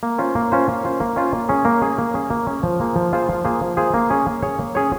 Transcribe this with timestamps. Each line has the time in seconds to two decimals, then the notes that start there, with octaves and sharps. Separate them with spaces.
0.03 A#3
0.18 C#4 F4 C5
0.35 A#3
0.52 C#4 F4 C5
0.68 A#3
0.84 C#4 F4 C5
1.00 A#3
1.16 C#4 F4 C5
1.33 A#3
1.49 C#4 G#4
1.65 A#3
1.82 C#4 G#4
1.98 A#3
2.14 C#4 G#4
2.30 A#3
2.47 C#4 G#4
2.63 F3
2.80 A#3 F4 G#4 C5
2.96 F3
3.12 A#3 F4 G#4 C5
3.29 F3
3.44 A#3 F4 G#4 C5
3.61 F3
3.77 A#3 F4 G#4 C5
3.94 A#3
4.10 C#4 G#4 C#5
4.26 A#3
4.42 C#4 G#4 C#5
4.59 A#3
4.75 C#4 G#4 C#5